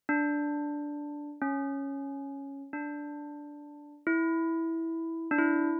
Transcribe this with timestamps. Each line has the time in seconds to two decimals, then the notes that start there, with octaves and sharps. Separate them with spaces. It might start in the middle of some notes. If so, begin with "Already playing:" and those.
0.09 D4
1.42 C#4
2.73 D4
4.07 E4
5.31 D4
5.38 E4